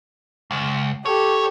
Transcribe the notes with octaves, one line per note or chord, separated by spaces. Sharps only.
C#2
G4 A4 C#5